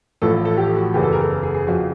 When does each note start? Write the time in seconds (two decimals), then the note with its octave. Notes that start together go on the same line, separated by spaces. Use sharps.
0.22 A1 A2 F3 A4
0.45 A4
0.57 G4
0.76 F#4
0.94 F#1 E2 C#3 E3 G4
1.03 A4
1.12 A#4
1.22 A4
1.43 G#4
1.54 G#4
1.66 F2 C#3 F#4